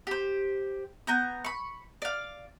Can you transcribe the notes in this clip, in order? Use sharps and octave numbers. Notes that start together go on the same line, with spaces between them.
G4 C5
B3 A#5 G6
B5 C#6
D5 F5